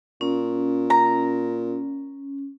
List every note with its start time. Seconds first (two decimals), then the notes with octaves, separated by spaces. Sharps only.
0.21 A#2 C#4
0.90 A#5